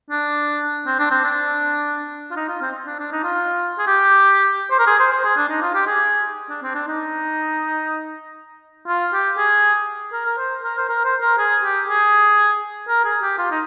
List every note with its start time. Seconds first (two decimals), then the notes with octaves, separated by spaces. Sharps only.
0.11 D4
0.87 C4
0.99 D4
1.11 C4
1.24 D4
2.31 F4
2.36 D#4
2.49 F4
2.61 C4
2.86 D4
2.99 D4
3.12 D#4
3.24 F4
3.79 G#4
3.87 G4
4.71 C5
4.79 A#4
4.87 G#4
4.99 C5
5.12 C5
5.24 G#4
5.37 D4
5.49 D#4
5.62 F4
5.75 G4
5.87 G#4
6.50 D4
6.62 C4
6.75 D4
6.88 D#4
8.87 F4
9.13 G4
9.38 G#4
10.13 A#4
10.26 A#4
10.38 C5
10.63 A#4
10.78 C5
10.89 A#4
11.05 C5
11.22 A#4
11.38 G#4
11.63 G4
11.88 G#4
12.89 A#4
13.05 G#4
13.22 G4
13.39 F4
13.51 D#4